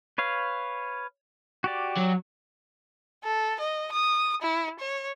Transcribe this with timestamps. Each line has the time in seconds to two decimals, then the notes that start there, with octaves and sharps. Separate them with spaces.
0.18 B4 C#5 F5
1.64 F#4 G4 D5
1.97 F#3
3.24 A4
3.60 D#5
3.92 D#6
4.42 E4
4.79 C#5